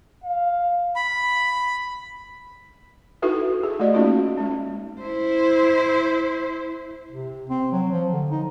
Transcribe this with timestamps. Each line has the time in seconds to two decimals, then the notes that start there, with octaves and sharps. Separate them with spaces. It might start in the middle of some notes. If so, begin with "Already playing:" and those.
0.24 F5
0.96 B5
3.22 D#4 E4 F#4 A4 B4 E5
3.63 G#4
3.80 A3 F#4 D5 D#5
3.94 A#3 C#4 D#4 F4 F#4
4.38 G#3 C#4
5.02 E4 C5
7.11 C3
7.49 C4
7.72 F#3
7.91 F3
8.12 D3
8.31 D#4